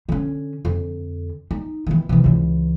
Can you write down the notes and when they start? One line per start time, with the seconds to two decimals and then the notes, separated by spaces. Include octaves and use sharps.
0.09 D3 C#4
0.65 F2 D3
1.51 D#4
1.87 D#3 E3
2.09 C3 E3
2.24 C#2 E3